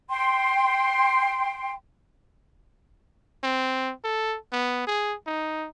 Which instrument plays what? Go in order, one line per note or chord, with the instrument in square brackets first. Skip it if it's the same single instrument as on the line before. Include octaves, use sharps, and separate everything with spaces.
[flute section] G5 C6
[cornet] C4
A4
B3
G#4
D#4